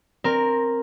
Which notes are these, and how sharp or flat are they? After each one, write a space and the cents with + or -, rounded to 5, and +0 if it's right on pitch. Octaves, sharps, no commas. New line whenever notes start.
C4 +15 A#4 +0